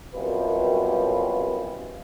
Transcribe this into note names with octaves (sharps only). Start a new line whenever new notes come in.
C2 F#2 B2 G3 F4 B4